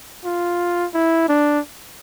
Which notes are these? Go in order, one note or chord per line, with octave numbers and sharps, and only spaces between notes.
F4
E4
D4